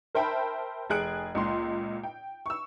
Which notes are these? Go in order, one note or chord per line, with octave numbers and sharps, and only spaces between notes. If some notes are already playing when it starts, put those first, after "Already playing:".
A#4 C5 E5 G5 A5 B5
F1 G#4 F#6 D7
C#2 A#2 C6
G5
C#6 E6